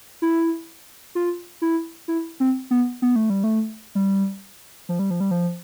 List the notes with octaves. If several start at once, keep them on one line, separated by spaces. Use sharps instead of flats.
E4
F4
E4
E4
C4
B3
B3
A3
G3
A3
G3
F3
G3
F3
G3
F3